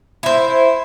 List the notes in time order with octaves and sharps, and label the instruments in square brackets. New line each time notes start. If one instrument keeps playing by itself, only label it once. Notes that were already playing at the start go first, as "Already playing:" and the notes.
[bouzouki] E4 C5